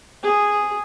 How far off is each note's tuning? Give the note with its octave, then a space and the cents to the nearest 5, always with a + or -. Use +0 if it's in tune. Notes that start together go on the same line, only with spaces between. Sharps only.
G#4 -5